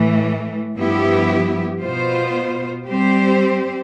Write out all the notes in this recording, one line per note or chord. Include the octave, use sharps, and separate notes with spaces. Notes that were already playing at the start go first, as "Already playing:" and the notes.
Already playing: A2 E3 A3
G2 F3 B3 E4 G4
B2 B3 F4 C5
G3 C4 G4 C5